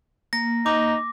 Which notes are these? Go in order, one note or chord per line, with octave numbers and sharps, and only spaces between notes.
A#3 A#6
D#4 D6